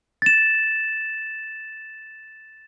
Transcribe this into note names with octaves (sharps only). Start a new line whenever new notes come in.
A6 E7